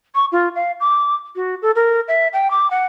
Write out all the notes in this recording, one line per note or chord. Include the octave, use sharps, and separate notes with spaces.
C#6
F4
F5
D6
F#4
A4
A#4
E5
G5
D6
F#5